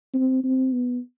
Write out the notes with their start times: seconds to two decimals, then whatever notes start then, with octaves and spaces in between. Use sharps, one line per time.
0.14 C4
0.44 C4
0.73 B3